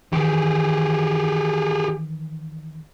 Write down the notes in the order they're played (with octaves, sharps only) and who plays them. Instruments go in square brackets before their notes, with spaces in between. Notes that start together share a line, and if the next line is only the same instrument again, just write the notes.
[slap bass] D#3 E3 [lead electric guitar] G4 G#4